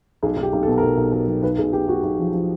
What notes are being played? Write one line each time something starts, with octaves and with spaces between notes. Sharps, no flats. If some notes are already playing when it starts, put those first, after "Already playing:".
B1 G#4
B1
G4
B1
A4
B2
A#4
B1 A4
B1
F#3 A#4
B1
B1 B4
B1 G#4
B1 G4
B1 F#4
B1
F3
F3